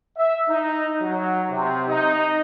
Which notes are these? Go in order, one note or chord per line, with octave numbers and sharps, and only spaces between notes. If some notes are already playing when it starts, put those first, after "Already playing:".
E5
D#4
F#3
C3
D#4